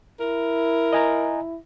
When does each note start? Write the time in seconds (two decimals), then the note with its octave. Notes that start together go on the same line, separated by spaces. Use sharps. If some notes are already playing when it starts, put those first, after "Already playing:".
0.20 E4 A#4
0.93 D#5 G#5 A#5